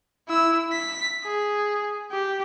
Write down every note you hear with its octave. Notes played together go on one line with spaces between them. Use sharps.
E4 E6
B6
G#4
G4